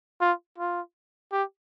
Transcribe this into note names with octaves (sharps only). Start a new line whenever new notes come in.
F4
F4
G4